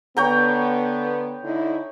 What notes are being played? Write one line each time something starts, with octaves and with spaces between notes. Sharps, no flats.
D3 B3 C#5 G5 A#5
D3 D#4 E4